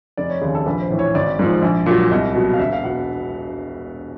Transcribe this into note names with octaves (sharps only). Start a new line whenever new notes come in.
F1 D5
C#5
D#2 C#3 G#4
A4
A#1 B4
C5
A2 E3
C#5
G#1 D5
G#2 F3
A#1
A#2 F#3
C2 D#5
B2 F#3
F5
E1 E5
F5
B2 F#5